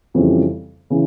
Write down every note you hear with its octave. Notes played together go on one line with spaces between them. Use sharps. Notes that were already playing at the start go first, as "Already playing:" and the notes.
F2 C#3 E3 G3 C4
C#3 E3